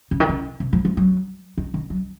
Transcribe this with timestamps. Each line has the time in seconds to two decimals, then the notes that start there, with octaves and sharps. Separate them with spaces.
0.11 C#3
0.20 D#3
0.29 C#3
0.60 C3
0.73 F3
0.85 F3
0.97 F#3
1.58 D#3
1.74 D#3
1.90 F#3